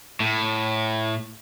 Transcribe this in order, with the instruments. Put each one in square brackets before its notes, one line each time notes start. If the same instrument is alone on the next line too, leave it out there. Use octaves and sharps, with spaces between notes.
[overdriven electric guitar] A2